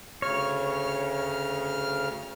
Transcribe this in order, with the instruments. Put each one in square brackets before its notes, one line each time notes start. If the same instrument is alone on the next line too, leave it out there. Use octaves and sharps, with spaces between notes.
[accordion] D2 C#3 F6 [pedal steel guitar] C#5